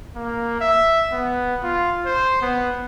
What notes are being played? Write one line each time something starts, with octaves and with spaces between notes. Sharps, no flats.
A#3
E5
B3
F4
C5
B3